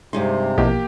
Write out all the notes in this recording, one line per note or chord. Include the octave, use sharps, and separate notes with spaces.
G2 C3 G#3 D#4 C6
A#1 B2 E3 A#3 G4 G5